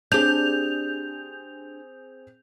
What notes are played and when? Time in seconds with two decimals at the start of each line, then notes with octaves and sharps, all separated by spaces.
0.12 C4 D4 G4 G#4 G6 F7